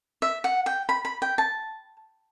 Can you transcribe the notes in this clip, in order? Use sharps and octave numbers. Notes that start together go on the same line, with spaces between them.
E5
F#5
G5
B5
B5
G5
A5